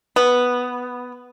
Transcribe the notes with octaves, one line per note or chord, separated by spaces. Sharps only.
B3